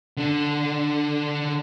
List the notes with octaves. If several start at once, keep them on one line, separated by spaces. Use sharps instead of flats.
D3 D4